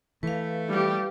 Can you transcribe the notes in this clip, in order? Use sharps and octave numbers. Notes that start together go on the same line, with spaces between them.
E3 A3 B4 F5
G3 G4